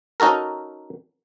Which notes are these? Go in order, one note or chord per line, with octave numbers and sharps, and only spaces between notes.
C#4 D#4 F#4 A4 A#4